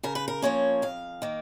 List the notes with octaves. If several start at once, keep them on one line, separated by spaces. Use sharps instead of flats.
C#3 A#4
B4
A#4
F3 A#3 C#4 C#5
F2 F5
D#3 A#3